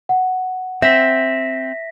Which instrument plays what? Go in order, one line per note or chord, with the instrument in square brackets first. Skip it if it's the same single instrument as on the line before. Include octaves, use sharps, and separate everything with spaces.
[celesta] F#5
[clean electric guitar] C4 [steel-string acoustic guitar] E5 [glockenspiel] A#6 B6